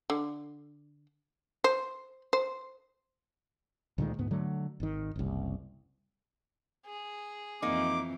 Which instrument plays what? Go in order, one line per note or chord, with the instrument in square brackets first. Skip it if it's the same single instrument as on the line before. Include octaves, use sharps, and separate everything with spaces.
[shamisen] D3
C5
C5
[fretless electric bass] D2 A#2 D#3 G#3
D2 G#2 B3
D3 F#3 A3
G#1 D#3
F#1 C2
[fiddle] G#4
[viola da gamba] F2 E3 C4 [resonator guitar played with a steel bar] A#3 D#4 [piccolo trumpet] D6